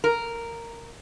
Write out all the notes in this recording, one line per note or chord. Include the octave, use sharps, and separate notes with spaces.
A#4